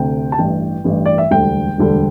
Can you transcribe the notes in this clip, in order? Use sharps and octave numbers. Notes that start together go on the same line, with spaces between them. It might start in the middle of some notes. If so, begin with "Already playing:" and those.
Already playing: D2 C3 A3 G5
A5
A1 G2 E3 G5
A1 G2 E3
D5
E5
E1 D2 D3 G3 G5
E1 D2 D3 G3